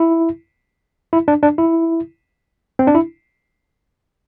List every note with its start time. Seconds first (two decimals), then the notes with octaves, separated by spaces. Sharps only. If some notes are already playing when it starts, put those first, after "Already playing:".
Already playing: E4
1.13 E4
1.28 D4
1.43 D4
1.58 E4
2.79 C4
2.87 D4
2.95 E4